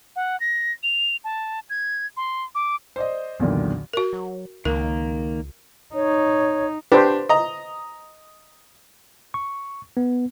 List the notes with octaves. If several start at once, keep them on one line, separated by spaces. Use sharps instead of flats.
F#5
A#6
F7
A5
G#6
C6
D6
C5 D5 D#5
B1 E2 A#2 D3 D#3
F#4 A#4
F#3
C#2 D#3 A#3 A#4
D#4 C#5
D4 G4 B4 C5
D#5 A#5
C#6
B3